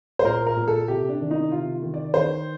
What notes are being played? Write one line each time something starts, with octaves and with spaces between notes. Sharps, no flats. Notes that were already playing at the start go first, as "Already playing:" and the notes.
C5
A#2 A#4
A#4
A#2
A4
C3 G4
D4
D#3
D#4
C3 F4
D#3
D5
D#3 C5